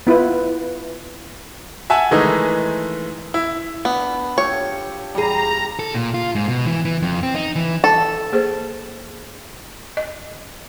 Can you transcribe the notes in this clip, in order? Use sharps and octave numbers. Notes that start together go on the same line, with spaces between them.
B3 E4 F4 B4
E5 F#5 G#5 A5
D#3 E3 G#3 A3 D#4
E4
B3 D4
F4 G4 A4 C#5
E2 G3 G#4 A#5
A4
A#2
F4
G#2
B2
E3
E3
F2
C4
D#4
E3
A4
A#3 G#4 C5
D#5